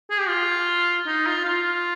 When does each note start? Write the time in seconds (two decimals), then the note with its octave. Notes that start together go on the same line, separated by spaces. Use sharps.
0.10 G#4
0.19 G4
0.28 F4
1.06 D#4
1.26 F4
1.45 F4